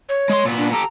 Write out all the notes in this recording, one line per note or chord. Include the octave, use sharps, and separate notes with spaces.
C#5
G#3 C6
A#2 B3
D4
G4 A4 A#5